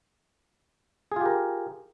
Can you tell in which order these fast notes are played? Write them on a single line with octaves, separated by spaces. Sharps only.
G#4 F4 G4 A#4